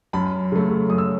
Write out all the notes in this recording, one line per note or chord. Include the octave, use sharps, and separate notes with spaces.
F#2 A5 B5
C#3 F#3 A3
F#2 D#6
E6